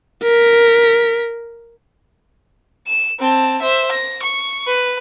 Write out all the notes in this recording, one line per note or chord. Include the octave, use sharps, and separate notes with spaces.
A#4 B6
E7
C4 A5
C5 E5
A#6
C#6
B4